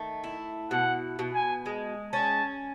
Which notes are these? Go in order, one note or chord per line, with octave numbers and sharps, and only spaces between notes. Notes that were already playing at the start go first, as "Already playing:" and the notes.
Already playing: D#3 A3
E4
B2 F#5
B2
G#5
G#3
C#4 A5